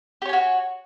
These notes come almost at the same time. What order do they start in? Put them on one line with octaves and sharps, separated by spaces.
G4 C#5 G#5 F#4